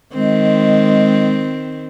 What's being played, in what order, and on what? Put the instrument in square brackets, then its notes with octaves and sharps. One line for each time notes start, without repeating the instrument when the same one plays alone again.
[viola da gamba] D#3 C4 [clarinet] G#3